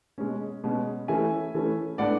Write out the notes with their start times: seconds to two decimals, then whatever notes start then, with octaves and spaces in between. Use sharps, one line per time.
0.18 B2 G#3 C#4
0.64 B2 G#3 C#4
1.08 E3 A3 C#4 E5 G#5
1.54 E3 A3 C#4
1.98 A2 G#3 B3 D4 D5 F#5